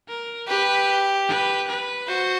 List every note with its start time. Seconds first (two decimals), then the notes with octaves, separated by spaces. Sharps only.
0.08 A#4
0.48 G4 B4
1.28 B4
1.68 B4
2.07 F#4 C5